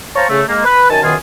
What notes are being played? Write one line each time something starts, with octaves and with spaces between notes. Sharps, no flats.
C5 C#5 F5 A5 A#5 C#6
C#3 A3
G#3 A#3
B4
F#2 D#3 G#5 A5
F#2 B2 D#3 F4 G#4 G#5